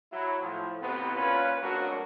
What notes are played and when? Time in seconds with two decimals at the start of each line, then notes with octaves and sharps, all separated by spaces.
0.12 F#3 E4
0.42 A2 F3
0.82 A1 C3 B3
1.15 A#2 C#4 F4 B4
1.61 G#1 D2 F#3 D4 F#4 A#4